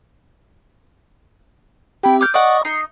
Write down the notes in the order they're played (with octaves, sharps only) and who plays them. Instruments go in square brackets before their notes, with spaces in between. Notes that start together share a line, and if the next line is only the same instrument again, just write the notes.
[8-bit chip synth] C4 G4 [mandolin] E4 G5
[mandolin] D6 F6 G6
[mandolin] D5 F#5 [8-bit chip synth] D#5 C#6 D#6
[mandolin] D#4 [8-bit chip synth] C7